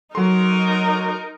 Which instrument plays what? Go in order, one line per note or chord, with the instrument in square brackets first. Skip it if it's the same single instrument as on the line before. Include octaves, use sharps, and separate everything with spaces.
[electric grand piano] F#3 C6 [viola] D#4 A#4